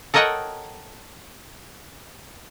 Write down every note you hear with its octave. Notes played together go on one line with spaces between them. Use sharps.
A4 A#4 C#5 D#5 F#5 G5